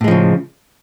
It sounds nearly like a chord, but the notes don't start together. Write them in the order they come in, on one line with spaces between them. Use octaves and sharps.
A2 G#3 F3 C#3